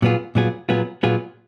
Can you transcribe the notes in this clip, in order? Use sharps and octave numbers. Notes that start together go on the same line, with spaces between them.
A#2 F#3 B3 F4 G#4
A#2 F#3 B3 F4 G#4
A#2 F#3 B3 F4 G#4
A#2 F#3 B3 F4 G#4